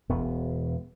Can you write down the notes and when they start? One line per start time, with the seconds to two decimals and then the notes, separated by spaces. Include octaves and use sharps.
0.09 E1 B3